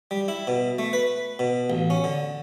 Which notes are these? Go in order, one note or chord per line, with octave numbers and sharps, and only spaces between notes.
G3
E4
B2
A3
B4
B2
A1
C#4
D3